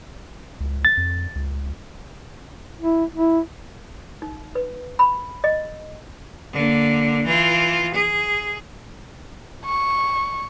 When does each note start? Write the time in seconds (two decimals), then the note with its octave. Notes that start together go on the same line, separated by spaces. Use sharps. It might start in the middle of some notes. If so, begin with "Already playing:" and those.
0.60 C#2
0.85 A6
0.97 F2
1.35 C#2
2.81 E4
3.16 E4
4.22 D#4
4.55 B4
4.99 B5
5.44 D#5
6.53 D3 A#3
7.26 E3 F4
7.94 G#4
9.66 C#6